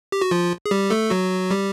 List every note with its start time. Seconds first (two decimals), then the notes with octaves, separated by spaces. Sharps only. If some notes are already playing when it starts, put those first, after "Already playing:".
0.12 G4
0.22 F#4
0.31 F3 F4
0.66 G#4
0.71 G3 G4
0.90 A3 A4
1.10 F#3 F#4
1.51 G3 G4